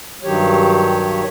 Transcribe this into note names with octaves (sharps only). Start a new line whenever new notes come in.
G2 D#3 F#3 G4 C#5